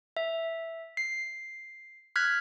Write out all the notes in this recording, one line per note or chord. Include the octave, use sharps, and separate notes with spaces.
E5
C7
F6 F#6 G#6 B6